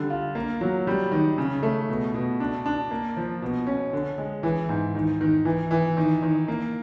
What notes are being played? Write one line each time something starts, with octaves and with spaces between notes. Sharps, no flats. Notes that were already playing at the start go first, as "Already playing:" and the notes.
Already playing: D3 G3
F4
A#3
F#3
G3
D#3
C#3
A3
B2
B2
D4
D4
A#3
F3
B2
C#4
D3
G#3
E3
G#2
D#3
D#3
E3
E3
D#3
D#3
A#3